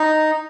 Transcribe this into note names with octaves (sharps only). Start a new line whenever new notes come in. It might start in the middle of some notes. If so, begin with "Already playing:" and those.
Already playing: D#4